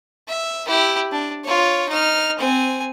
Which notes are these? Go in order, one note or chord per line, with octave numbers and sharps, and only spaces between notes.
E5
E4 G4
D4
F4 C#5
D#4 F6
C4 G#5